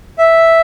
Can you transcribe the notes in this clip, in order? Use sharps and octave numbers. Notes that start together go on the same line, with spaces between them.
E5